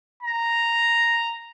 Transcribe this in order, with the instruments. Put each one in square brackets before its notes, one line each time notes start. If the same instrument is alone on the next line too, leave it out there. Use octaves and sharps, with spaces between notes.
[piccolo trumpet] A#5